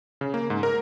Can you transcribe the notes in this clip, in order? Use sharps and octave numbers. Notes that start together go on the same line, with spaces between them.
C#3
A#3
G#2
A#4